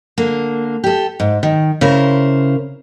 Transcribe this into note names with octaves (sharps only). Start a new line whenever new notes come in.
D3 A#3
G4 A4
G#2
D#3
C#3 E4 A#4 C5